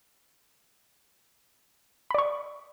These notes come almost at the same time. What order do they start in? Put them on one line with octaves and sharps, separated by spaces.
B5 D5 C#6